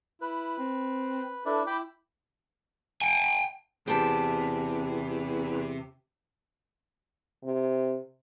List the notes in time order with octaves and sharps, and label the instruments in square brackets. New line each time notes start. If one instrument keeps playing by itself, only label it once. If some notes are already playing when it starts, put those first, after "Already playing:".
[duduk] E4 [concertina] B4
[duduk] C4
[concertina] D4 E4 B4 [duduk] A4
[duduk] E4 [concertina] G5 B5 D6
[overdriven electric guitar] G5 G#5
[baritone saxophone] E2 [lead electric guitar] C3 [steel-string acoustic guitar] G4 A5
[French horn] C3